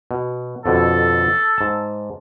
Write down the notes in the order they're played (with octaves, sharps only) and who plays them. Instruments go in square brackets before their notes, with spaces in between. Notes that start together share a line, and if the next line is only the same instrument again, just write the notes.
[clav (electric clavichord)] B2
[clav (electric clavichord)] F2 B2 D3 [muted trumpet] A4
[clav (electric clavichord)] G#2 A5